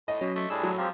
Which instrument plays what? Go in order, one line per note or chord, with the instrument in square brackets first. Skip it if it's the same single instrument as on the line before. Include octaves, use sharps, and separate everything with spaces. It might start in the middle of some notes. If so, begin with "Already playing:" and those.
[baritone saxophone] A2 [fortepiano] D#5
[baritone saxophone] B2 [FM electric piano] F#3 C#4
[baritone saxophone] A3
[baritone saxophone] A2 [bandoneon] G3 D4 G#4 [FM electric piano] E6
[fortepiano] F#3
[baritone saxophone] F3 [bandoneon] G#3 C4 G4 [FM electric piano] F5 A#5